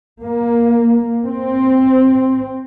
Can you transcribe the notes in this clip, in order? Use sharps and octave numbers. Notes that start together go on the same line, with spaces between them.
A#3
C4